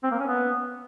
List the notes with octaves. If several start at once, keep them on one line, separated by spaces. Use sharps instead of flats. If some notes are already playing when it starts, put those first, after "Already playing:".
C4
A#3
C#4
B3